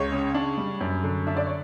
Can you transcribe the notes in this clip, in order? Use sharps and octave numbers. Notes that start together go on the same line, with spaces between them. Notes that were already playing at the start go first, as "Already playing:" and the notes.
Already playing: C#2 C#5
C#3
D4
G3
F#2
D3
D4 E5
D5
C#5